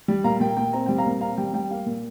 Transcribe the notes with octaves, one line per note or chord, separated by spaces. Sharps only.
G3
A#2 F5 A#5
A#2 G5
A#2 G5
C4 A#5
G3 G5
F5 A#5
A#2
C4 F5 A#5
G3 G5
G3 G5
A#3 F5
A#2